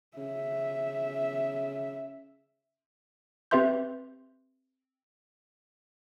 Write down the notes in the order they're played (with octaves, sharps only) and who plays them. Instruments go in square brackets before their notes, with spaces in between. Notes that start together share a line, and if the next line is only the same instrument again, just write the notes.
[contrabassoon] C#3 [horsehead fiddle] E5
[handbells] C4 G4 B4 E5 C6 G6